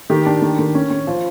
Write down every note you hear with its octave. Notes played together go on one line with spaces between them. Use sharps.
D#3 G4
D4
D#3
D#3
C#4
C#4
F3